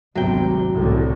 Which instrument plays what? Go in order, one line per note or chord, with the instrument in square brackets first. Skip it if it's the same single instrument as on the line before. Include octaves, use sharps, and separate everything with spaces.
[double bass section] G#1 D2 C3 [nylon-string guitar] F#3 G5
[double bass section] C2 A2 D3